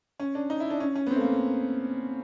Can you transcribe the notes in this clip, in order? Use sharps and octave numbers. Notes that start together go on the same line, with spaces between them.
C#4
D4
D#4
E4
D4
C#4
C#4
B3
C4
A3
A#3